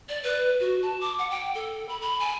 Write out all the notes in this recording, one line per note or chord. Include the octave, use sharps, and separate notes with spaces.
D5
B4
F#4
A5
D6
F#5
G5
A4
B5
B5
G#5